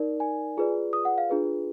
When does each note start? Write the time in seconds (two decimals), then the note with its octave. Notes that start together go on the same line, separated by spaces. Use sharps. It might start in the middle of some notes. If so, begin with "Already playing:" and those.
Already playing: D#4 A#4 D5
0.20 G#5
0.57 F4 G#4 B4 D5
0.93 D#6
1.05 F#5
1.18 F5
1.30 D4 F4 G#4 B4